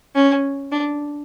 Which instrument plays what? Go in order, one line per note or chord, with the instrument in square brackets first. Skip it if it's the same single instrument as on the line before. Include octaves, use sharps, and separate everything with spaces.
[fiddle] C#4
D4